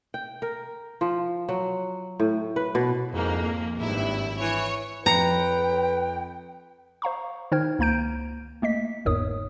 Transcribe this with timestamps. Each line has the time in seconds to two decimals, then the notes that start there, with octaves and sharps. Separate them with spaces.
0.14 G5
0.42 A#4
1.01 F3
1.49 F#3
2.20 A2
2.56 B4
2.75 B2
3.11 F2 G#2 A#3
3.78 G#1 G2 E4
4.41 E3 C#5
5.06 F2 F4 B4 G5 A#5 C#7
7.02 C5 F5 A#5 C#6
7.52 D#3 D#4 C5 G5 F6 G#6
7.79 C#2 A#3 A#5 G6 D7
8.62 A3 A#3 D#5 B6
9.05 G1 E2 G#2 A#4 C#5 D#6